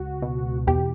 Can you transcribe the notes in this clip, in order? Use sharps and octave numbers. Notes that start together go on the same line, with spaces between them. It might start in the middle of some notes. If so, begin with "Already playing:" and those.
Already playing: C#2 F#4
B2
E2 G4